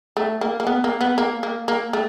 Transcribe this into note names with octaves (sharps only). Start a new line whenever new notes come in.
A3
A#3
A#3
B3
A#3
B3
A#3
A#3
A#3
A3